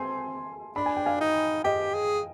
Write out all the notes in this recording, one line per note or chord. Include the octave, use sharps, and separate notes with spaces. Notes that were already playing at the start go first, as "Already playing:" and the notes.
Already playing: C4 G#5 C6
D4 B5
G#5
G5
F5 G#5
D#4
G4 D#5 G5
G#4